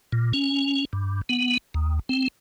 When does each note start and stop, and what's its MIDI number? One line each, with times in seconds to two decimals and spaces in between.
0.12 0.33 46
0.34 0.85 61
0.93 1.21 43
1.29 1.57 59
1.74 1.99 39
2.09 2.28 60